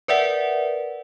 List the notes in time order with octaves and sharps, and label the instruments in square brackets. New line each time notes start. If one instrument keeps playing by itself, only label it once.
[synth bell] A#4 B4 D5 E5 F#5